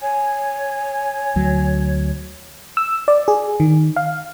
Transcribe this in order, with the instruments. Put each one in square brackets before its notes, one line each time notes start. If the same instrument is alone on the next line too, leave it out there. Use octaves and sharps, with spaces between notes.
[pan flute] C#5 [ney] G#5
[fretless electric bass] D2 F#3
[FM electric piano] E6
D5
G#4
D#3
F5